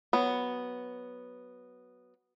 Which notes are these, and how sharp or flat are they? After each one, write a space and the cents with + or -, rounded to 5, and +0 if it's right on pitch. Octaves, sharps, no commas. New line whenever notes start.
F#3 +0 B3 +0